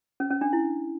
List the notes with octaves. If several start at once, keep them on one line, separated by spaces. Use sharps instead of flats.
C#4
C#4
D4
E4